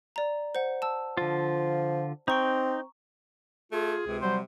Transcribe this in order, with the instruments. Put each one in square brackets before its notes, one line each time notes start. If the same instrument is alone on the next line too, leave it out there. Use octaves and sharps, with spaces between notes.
[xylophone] D5 A#5
C5 F#5
A5 E6
[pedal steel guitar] D3 F4 [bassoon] F3
[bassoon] C4 [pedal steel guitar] D#4 G5 [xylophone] A#5 C#6
[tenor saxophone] A3 [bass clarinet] F4 [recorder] G#4
[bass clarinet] C#2 [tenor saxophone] C3
[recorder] F#3 [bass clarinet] G3 [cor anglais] C5